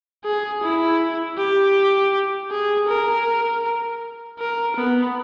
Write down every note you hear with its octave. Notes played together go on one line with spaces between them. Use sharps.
G#4
E4
G4
G#4
A#4
A#4
B3